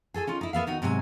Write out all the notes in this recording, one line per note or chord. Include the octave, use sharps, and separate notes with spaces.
G#4 A4 C#5 G#5
C#4 D#4 F4
D#4 E4
A#3 B3 E5 F5
D#2 D#4 F#4
G#2 C3 F#3 C5 G#5